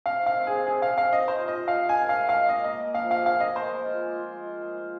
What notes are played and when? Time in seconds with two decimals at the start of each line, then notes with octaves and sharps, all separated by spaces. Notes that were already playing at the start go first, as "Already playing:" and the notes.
0.06 C3 F5
0.22 D#3 F5
0.37 C4
0.47 C3 G#4
0.67 C4 G#4
0.82 C3 F5
0.97 D#3 F5
1.13 C3 D#5
1.28 F4 C5
1.43 F4 D#5
1.58 F4
1.68 F5
1.73 G#3
1.88 A#4 G#5
2.04 A#4
2.09 F5
2.19 G#3
2.29 F5
2.35 G#3
2.49 A#3 D#5
2.64 A#3 D#5
2.80 A#3
2.95 F3 F5
3.10 G#4 F5
3.26 F3 F5
3.40 A#3 D#5
3.55 A#3 C5
3.71 G#3
3.86 F4
4.02 G#4
4.17 F4
4.33 G#3
4.47 F4
4.62 G#4
4.77 F4